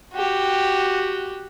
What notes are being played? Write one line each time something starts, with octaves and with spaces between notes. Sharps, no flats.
F#4 G4